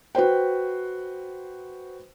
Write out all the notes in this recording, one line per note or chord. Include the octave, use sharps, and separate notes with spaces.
F#4 B4 C5 G5